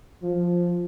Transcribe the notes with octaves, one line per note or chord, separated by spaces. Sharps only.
F3